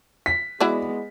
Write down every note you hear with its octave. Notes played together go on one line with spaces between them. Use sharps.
B6
G#3 B3 E4 F#4 D5